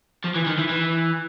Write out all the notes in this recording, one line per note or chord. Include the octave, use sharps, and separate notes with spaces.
F3
E3
D#3
E3
E3